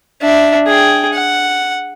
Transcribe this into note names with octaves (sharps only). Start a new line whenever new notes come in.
D4 E5
G#4 G5
F#5